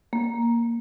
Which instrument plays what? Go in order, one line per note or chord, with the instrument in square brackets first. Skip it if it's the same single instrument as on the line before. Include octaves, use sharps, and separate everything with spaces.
[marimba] A#3